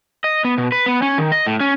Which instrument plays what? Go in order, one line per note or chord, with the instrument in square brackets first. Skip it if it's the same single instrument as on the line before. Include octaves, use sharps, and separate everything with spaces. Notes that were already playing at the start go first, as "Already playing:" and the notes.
[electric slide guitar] D#5
B3
B2
B4
B3
C#4
D#3
D#5
A2
C#4